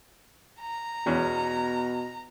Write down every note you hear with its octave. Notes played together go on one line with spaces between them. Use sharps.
A#5
E2 B2 C#4